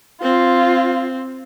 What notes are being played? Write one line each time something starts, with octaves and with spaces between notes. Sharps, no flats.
C4 F4